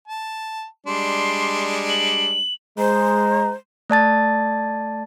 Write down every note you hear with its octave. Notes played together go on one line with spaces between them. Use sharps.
A5
G3 G#3 D4 C6
F#7
G#3 C5 A#5
A3 D5 A5 A6